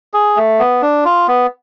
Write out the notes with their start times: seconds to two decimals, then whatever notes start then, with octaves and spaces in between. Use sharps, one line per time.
0.14 G#4
0.36 A3
0.59 B3
0.82 D4
1.05 F4
1.28 B3